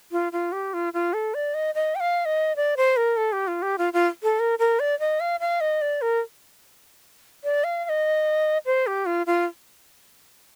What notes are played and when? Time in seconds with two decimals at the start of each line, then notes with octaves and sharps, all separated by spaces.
0.12 F4
0.32 F4
0.52 G4
0.74 F4
0.93 F4
1.13 A4
1.34 D5
1.54 D#5
1.75 D#5
1.95 G5
2.00 F5
2.25 D#5
2.56 D5
2.77 C5
2.97 A#4
3.17 A4
3.32 G4
3.47 F4
3.62 G4
3.78 F4
3.93 F4
4.23 A4
4.39 A#4
4.59 A#4
4.80 D5
5.00 D#5
5.20 F5
5.40 F5
5.61 D#5
5.82 D5
6.02 A#4
7.44 D5
7.64 F5
7.85 F5
7.89 D#5
8.66 C5
8.87 G4
9.06 F4
9.27 F4